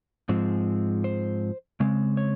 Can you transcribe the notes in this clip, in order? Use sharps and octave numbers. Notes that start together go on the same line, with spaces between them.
G#2 F3 G#3 C4
C5
C#3 G#3 C4
C#5